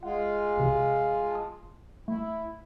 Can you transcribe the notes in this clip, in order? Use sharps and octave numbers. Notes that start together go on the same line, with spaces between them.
G#3 F4 F#5
C2 C3
A5 D#6
A3 E4